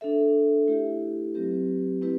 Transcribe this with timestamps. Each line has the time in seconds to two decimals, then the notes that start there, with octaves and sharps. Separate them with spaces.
0.01 D4 A4 E5
0.68 A3 E4 G4
1.34 F#3 C4 G4 B4
2.02 A3 C4 E4 G4 B4